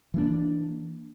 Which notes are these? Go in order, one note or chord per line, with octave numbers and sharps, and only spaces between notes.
E3 A#3 D4